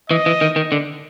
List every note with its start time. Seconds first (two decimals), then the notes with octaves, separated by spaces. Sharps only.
0.10 E3 D#5
0.26 E3
0.41 D#3
0.56 D#3
0.72 D3